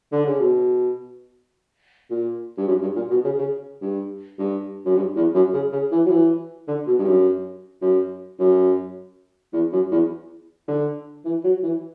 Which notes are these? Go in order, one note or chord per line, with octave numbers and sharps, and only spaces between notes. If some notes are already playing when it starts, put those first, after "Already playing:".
D3
C#3
B2
A#2
G2
F#2
G2
A#2
B2
C#3
C#3
G2
G2
F#2
G2
E2
F#2
C#3
C#3
E3
F#3
E3
D3
B2
G2
F#2
F#2
F#2
E2
F#2
E2
D3
E3
F#3
E3